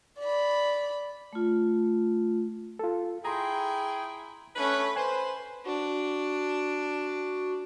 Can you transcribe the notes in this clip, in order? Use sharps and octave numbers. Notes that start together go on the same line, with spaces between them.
D5 B5
A3 F4
F4 A4
E4 G#4 G5 A#5 C6
A3 C#4 B4
B4 C5 G#5
D4 F#4